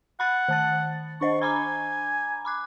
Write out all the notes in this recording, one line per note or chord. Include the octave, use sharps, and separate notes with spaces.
F#5 B5 F#6 A6
D#3 A5 A6
D4 C5 D#5 C#6
G#5 A#5 B5 D6
B5 D6 F#6